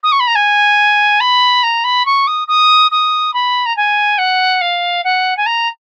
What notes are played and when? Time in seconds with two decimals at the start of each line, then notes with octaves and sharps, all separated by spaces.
0.03 D#6
0.12 C#6
0.20 B5
0.27 A#5
0.35 G#5
1.20 B5
1.63 A#5
1.84 B5
2.06 C#6
2.27 D#6
2.48 D#6
2.91 D#6
3.34 B5
3.66 A#5
3.77 G#5
4.18 F#5
4.61 F5
5.04 F#5
5.37 G#5
5.46 A#5